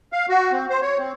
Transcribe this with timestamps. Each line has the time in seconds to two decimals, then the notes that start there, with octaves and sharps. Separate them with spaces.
0.13 F5
0.29 F#4
0.52 C4
0.70 C5
0.82 C#5
0.98 C4